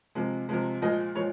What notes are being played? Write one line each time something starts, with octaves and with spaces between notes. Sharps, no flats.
C3 F3 G#3
C3 F3 G#3
A#2 F3 G#3 D#5
A#2 F3 G#3 C#5